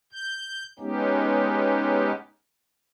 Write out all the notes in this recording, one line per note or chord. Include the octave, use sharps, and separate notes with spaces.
G6
G#3 B3 C#4 D#4 G4